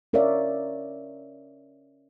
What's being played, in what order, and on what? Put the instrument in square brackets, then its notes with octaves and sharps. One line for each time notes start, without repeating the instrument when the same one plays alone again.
[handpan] C#4 A#4 C#5 D5 E5 F5